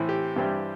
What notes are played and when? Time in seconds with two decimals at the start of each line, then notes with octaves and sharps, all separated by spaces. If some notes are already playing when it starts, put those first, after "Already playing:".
Already playing: A2 E3 C4 E4
0.09 G4
0.36 G2 E3 G3 C4 E4